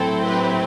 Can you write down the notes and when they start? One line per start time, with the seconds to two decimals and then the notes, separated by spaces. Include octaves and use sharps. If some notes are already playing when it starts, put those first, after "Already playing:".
Already playing: A2 F#3 C4 E4 A4
0.25 G4 B4